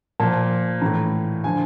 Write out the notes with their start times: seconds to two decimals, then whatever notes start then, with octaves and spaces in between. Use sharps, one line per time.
0.20 A#2 F3 A5
0.81 A2 E3 A#5
1.44 D3 F3 G#5